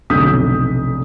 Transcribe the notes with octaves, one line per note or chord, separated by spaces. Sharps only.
F1 B1 D3 D#6 G6 B6